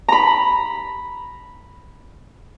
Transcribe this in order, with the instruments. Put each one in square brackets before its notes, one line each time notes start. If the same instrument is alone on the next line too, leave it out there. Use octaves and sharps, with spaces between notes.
[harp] A#5 B5